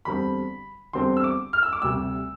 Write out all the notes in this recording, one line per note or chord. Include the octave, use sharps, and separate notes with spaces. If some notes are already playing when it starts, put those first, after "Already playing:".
E2 D3 G3 C4 B5
E2 D3 G3 C4 C6
E6
D6
F6
E6
D6
D2 C3 G3 E6